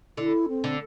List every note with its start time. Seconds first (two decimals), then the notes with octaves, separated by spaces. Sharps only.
0.17 D3 E4
0.48 C4
0.64 D3